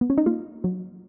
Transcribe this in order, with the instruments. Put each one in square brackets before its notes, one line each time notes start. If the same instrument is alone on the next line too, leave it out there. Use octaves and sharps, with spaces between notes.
[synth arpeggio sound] B3
C#4
D#4
A#3 F4
F#3